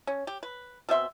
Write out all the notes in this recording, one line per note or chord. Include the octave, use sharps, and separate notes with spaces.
C#4
G4
B4
B2 C4 E5 C6